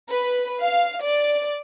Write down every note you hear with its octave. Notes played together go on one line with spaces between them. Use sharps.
B4
F5
D5